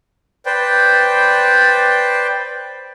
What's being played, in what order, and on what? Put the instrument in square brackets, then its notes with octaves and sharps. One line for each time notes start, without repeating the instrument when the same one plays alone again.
[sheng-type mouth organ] B4 C5 D5 G5